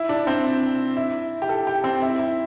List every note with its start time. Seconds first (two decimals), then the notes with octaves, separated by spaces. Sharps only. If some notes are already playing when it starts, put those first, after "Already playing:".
Already playing: E4
0.09 D4
0.27 C4
0.97 E4
1.42 G4
1.49 A4
1.67 G4
1.84 C4
2.02 E4
2.19 E4